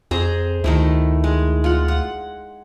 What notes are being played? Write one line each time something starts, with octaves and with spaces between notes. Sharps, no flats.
F2 G#4 C5 A#5
D2 D#3 A3 E4
G#3
F4 F#5
F#5